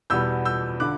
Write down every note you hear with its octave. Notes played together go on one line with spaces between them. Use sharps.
E2 B2 G3 B3 E6 G6
E6 G6
D3 D6 F#6